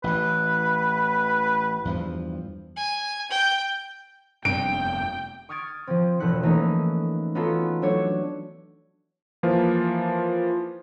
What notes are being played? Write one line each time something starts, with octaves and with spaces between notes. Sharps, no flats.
A1 E3 B4
E2 G2 F3
G#5
G5
F1 G2 B3 C4 G5 D7
C#6 D#6 F6 G#6 A6 D7
F3 C4
E1 F3 E4 F#6 C#7
E3 A3 A#3 C#4 D#4
B3 C#4 D#4 F4 F#4 A4
F#3 A3 D4 C#5
E3 F3 A#3 F4